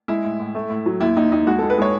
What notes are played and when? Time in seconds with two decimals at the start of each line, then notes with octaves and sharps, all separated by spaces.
0.08 G#3 E4
0.24 A2
0.40 A2
0.55 A3
0.70 A2
0.86 F#3
1.00 D#2 E4
1.16 D#2 D#4
1.32 D#2 D#4
1.47 G#3 F#4
1.58 A4
1.62 G#3
1.70 B4
1.78 G#3 C#5